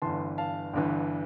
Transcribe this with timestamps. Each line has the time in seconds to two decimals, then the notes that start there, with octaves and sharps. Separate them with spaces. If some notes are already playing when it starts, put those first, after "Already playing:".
0.02 G1 G2 E3 A5 C6
0.38 F5 A5
0.73 G1 G2 E3